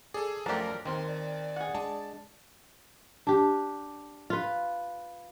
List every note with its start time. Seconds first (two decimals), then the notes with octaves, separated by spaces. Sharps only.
0.14 G#4 A4 D5
0.46 F#2 F3 A3 D4 G4 A#4 D5 A#5
0.85 D#2 D#3 C4 A#4 C6
1.07 D5
1.56 G#4 F#5
1.75 G#3 D4 A5
3.27 D4 G4
4.30 F4 B4